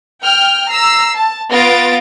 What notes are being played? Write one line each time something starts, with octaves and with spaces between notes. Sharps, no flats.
G5 F6
A#5 E6 C7
A5
B3 F4 A6 A#6 D7